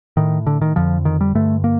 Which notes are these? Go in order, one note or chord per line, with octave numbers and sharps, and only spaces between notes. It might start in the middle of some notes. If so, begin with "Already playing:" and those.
A2 D#3
D3
D#3
F2 D3 F3
D#3
G3
G2 D3 A3
A#3